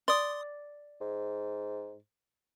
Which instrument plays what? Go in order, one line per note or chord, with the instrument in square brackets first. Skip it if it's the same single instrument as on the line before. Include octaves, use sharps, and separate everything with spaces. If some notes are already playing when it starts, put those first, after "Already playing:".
[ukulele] D5 [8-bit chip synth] C6 D#6
[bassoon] G#2